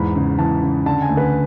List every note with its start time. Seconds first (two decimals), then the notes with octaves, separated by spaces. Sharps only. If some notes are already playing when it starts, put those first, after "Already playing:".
Already playing: E2 G#2 B5
0.15 C#3
0.39 E3 A5
0.62 C#3
0.86 D3 A5
1.02 G#5
1.09 D2
1.17 B4